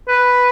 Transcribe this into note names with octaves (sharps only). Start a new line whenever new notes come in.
B4